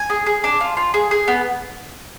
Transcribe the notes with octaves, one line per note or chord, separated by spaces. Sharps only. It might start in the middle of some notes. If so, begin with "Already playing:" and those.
Already playing: G#5
G#4
G#4
D4
F4
F4
G#4
G#4
B3